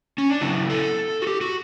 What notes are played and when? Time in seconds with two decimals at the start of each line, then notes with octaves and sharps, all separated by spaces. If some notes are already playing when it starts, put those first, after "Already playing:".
0.18 C#4
0.30 D4
0.41 C#3 F#3 B3 E4
0.69 A4
1.22 F#4
1.27 G4
1.41 F#4